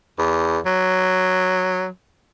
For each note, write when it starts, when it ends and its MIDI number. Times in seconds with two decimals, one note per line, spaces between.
0.18 0.58 40
0.66 1.87 54